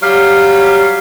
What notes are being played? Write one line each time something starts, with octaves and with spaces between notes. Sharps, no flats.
F#3 G3 C#5 F5